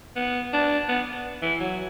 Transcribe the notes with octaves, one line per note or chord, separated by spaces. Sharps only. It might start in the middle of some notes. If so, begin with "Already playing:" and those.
B3
D4
B3
E3
F#3